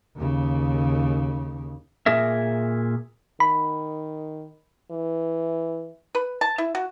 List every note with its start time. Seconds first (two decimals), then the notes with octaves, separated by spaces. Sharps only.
0.16 D#2 C#3
2.06 A#2 G#4 A#4 E5
3.40 D#3 B5
4.91 E3
6.15 B4
6.41 A5
6.58 E4
6.75 F#4